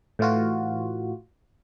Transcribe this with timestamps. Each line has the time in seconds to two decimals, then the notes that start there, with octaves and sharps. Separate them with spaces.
0.19 A2 E3 F4 F#4